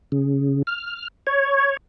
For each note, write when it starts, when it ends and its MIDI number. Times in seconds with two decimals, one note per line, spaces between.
0.12 0.62 49
0.67 1.08 89
1.27 1.77 73